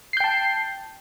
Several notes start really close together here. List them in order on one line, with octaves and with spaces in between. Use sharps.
C7 G6 G5 A5